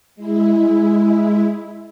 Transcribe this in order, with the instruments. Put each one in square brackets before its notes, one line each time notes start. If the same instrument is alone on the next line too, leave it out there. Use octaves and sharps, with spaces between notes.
[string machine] G#3 E4